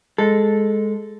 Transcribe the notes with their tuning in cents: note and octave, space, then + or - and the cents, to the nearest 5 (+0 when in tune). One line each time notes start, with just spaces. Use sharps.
G#3 +0 A4 -5